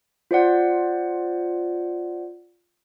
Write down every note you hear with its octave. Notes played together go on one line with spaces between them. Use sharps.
F4 C5 D5 F#5